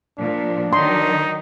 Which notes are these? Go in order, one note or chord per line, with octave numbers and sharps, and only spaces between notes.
A#2 F3 D4
D#3 F#3 D#4 C6